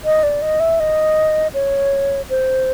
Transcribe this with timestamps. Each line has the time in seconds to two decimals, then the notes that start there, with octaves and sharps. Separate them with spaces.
0.05 D#5
0.23 D5
0.42 D#5
0.60 E5
0.80 D#5
1.54 C#5
2.30 C5